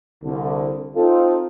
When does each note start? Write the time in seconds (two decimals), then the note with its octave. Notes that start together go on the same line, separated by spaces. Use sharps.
0.24 C2 D3
0.95 C4 D#4 F4 A4